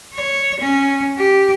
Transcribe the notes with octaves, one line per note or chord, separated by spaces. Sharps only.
C#5
C#4
G4